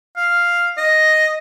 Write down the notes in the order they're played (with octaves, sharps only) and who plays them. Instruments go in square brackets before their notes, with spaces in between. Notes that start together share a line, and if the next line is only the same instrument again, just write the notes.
[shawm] F5
D#5